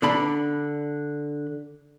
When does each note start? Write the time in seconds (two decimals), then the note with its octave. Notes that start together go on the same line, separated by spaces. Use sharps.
0.02 D3 D4 B5